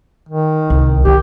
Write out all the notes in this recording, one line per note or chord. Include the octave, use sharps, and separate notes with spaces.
D#3
C2
D#3 G4